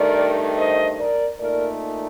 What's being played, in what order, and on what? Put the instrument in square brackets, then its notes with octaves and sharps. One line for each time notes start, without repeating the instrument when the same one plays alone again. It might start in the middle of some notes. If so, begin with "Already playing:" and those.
Already playing: [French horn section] G2 D#3 A3 A#4 D5
C5 D#5
A#4 D5
A#2 A3 D#4 A#4 D5